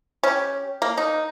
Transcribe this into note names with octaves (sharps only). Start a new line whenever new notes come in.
C#4 G4
A#3
D#4